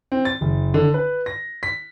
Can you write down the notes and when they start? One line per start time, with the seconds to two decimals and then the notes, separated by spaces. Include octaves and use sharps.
0.12 C4
0.25 A6
0.41 F#1
0.74 D3
0.94 B4
1.26 A#6
1.63 B6